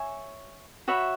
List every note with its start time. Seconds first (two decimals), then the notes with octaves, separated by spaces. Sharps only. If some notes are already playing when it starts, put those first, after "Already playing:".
Already playing: C#5 E5 G#5
0.88 F#4 C#5 E5 B5